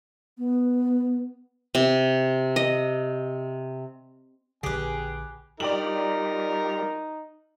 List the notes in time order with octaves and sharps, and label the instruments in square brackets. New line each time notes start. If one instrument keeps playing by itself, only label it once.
[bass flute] B3
[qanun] C3
D#5
[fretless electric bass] A#1 D3 [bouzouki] G4 B4 [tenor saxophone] G#4 [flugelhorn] G#5
[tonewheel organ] G3 F4 G4 [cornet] D#4 [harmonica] A#4 [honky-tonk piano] D5 G5 F#7